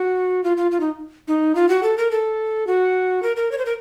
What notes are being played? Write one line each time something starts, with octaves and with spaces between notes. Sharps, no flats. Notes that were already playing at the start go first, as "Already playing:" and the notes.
Already playing: F#4
F4
F4
F4
D#4
D#4
F4
F#4
A4
A#4
A4
F#4
A#4
A#4
C#5
C5
A#4